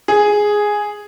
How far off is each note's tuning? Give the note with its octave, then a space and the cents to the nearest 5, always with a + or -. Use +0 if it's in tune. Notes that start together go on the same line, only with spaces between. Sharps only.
G#4 +0